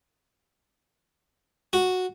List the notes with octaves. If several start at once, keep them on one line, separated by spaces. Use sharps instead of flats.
F#4